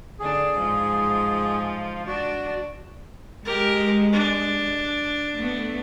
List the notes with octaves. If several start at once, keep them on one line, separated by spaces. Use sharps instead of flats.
D3 D4 G#4
G#2 F3
D4 F#4
G#3 G4 A#4
D4
A3 B3